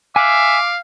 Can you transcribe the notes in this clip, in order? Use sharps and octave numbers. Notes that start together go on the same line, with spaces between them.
E5 F5 G#5 D6 F#6